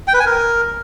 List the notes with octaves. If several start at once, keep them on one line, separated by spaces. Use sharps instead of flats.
G5
B4
G#5
A#4